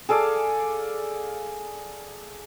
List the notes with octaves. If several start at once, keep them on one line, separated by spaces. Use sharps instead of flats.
G#4 A4 D5 F5